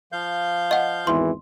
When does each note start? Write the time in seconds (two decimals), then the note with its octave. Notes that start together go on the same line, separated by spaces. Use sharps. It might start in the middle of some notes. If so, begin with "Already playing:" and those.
0.12 F3 F5 G6
0.71 D#5 F#5
1.07 G#1 E2 E3 C6